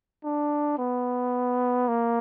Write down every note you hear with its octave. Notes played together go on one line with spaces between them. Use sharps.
D4
B3
A#3